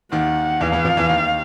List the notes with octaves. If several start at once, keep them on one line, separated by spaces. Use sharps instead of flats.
D#2 D#3 F#5
E2 E3 F5
E2 E3
F2 F3
E2 E3
D#2 D#3